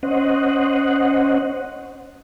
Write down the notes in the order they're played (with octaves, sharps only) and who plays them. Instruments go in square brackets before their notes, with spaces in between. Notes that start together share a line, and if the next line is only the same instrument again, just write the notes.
[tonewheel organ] C#4 C5 D#5 F#5